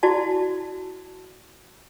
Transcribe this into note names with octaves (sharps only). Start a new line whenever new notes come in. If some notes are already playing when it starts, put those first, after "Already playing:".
E4 F#4 D5 A5